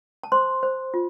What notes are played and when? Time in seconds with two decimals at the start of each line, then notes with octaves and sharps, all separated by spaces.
0.23 A5
0.32 C5 C6
0.63 C5
0.94 F4